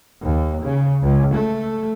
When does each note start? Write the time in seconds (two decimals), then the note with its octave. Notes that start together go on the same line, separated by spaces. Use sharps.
0.23 D#2
0.64 C#3
1.02 C#2
1.34 A3